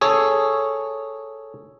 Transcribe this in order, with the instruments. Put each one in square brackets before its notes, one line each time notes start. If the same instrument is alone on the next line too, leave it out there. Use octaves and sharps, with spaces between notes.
[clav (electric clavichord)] G#4 A4 C#5